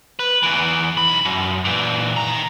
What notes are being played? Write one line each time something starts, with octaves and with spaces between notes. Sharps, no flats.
B4
E2 E3
B1 B5
F#2
A#2 E3
D#3 A#5